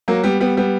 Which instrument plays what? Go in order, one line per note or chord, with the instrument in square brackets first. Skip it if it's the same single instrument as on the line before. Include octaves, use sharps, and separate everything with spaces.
[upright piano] F#3 A#3
G3 B3
G3 B3
G3 B3